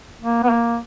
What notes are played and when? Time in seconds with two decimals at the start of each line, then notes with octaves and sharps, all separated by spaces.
0.21 A#3
0.43 B3
0.51 A#3